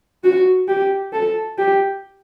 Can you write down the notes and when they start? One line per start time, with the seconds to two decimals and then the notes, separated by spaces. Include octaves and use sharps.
0.24 F#4
0.68 G4
1.13 A4
1.58 G4